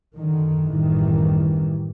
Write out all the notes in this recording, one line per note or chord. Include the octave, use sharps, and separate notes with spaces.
F#2 D3 D#3
A1 F#2 D#3 E3 G3